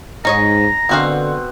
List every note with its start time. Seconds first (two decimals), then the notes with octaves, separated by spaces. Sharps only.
0.25 G#2 D#4 C#5 D#5 A#5
0.89 B2 D3 B3 C4 F#4 F5 F#5